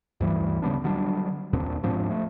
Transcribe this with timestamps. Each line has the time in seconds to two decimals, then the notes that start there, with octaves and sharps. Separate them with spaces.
0.21 D2 G2 E3 G3
0.62 C#3 G3 B3 D4
0.84 D3 F#3 G3 D4
1.53 D#2 A#2 C4 D4
1.83 G#2 F3 C4 D4
2.09 F3 A3